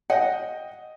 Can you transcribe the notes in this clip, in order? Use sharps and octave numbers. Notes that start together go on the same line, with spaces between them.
D#5 F#5 G5 A#6